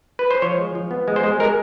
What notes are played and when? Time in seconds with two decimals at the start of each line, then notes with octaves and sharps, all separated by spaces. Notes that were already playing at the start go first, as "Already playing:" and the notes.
0.19 B4
0.31 C5
0.42 F3 C#5
0.58 G#3
0.75 F3
0.91 B3
1.08 G#3
1.16 C5
1.23 G#3
1.40 G#3 A#4